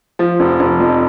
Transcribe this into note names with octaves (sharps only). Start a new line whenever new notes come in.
F3
F1
F1
F2